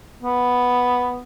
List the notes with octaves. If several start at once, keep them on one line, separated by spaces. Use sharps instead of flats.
B3